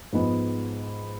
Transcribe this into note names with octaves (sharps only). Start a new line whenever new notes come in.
G#2 F3 G#3 B3